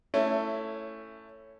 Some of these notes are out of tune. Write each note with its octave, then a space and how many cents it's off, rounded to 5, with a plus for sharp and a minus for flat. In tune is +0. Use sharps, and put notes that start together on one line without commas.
A3 +15 C#4 +0 E4 +0